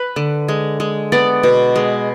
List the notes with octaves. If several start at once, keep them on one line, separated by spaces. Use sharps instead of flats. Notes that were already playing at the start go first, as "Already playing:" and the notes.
Already playing: B4
D3
G#3
G#3
B3 D5
B2
G#3